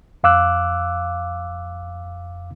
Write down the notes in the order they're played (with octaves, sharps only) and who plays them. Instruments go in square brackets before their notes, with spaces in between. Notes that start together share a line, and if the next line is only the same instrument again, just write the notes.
[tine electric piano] F2 F5 D6 E6 F#6